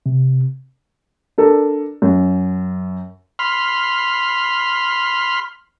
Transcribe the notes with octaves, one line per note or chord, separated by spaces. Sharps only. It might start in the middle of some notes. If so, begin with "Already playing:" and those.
C3
D4 A4 A#4
F#2
B5 C6 F6